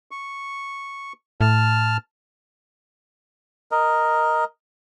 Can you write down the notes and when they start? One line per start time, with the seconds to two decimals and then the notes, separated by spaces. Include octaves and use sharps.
0.11 C#6
1.41 A2 A5 F6
3.71 A#4 D#5